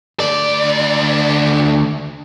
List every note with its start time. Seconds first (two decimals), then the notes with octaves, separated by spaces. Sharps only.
0.20 D2 D5